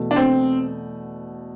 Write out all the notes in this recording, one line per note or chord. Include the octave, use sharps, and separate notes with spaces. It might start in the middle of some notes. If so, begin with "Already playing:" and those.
Already playing: E2 B2 A3
D4
C4